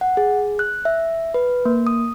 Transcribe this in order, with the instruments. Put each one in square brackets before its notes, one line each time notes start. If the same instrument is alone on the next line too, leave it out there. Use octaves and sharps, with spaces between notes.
[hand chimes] F#5
G#4
F#6
E5
B4
A#3
D#6